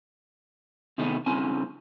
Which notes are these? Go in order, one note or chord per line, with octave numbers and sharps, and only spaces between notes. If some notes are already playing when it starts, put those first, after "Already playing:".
C3 D#3 A3 B3 D#4 G#4
G2 C#3 C4 E4 G#5